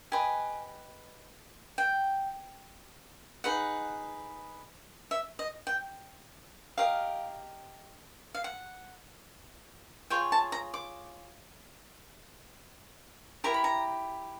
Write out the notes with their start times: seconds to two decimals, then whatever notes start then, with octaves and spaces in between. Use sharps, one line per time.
0.12 G4 B4 D#5 G#5
1.78 G5
3.44 D#4 G#4 B4 F#5
5.11 E5
5.39 D#5
5.67 G5
6.78 G4 A#4 D#5 F5
8.35 F5
8.44 F#5
10.10 F4 G#4 C#5 G5
10.32 A5
10.52 A#5
10.74 D6
13.44 E4 G4 A#4 A#5
13.54 B5
13.64 A#5